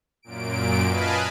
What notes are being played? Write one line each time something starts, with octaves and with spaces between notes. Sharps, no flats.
F#2 A#2 D7
B4 D#5 F5 G#5 A5 B5